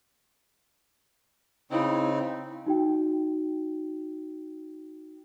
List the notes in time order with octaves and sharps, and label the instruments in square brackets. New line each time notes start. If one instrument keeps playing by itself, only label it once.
[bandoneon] C#3 C4 D#4 [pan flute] E4
[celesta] D#4 F#4 G5